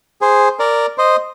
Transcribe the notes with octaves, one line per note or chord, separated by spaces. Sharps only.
G#4 C5
A#4 D5
C5 D#5